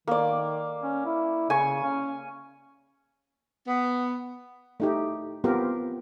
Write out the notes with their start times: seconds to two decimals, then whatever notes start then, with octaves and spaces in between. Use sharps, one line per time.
0.07 D#3 A#3 D5
0.83 C#4
1.05 E4
1.50 C#3 G#5 C#6
1.83 C#4
3.67 B3
4.80 A3 D#4 G4
5.44 B3 C4 F4 G4 A#4